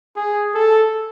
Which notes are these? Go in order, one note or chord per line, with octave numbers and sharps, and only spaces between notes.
G#4
A4